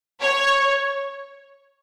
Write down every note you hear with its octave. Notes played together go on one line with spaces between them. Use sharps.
C#5